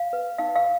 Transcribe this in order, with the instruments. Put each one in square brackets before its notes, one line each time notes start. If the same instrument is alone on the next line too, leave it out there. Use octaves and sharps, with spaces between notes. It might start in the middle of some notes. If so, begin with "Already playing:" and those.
Already playing: [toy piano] F5
B4
D#4 F5
F5